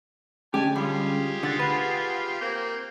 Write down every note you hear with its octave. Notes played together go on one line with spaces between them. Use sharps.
D3 G#3 C#4 G4 G#5 A5
G3 F4 G4 G#4
D3 F#5 A6
B4
A#3 C4 G6